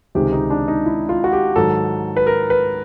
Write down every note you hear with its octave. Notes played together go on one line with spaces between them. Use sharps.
C#2 C3 D#3 G#3 G4
D#4
D4
D#4
E4
F4
F#4
G4
G#2 D#3 F#3 A4
B4
A#4
B4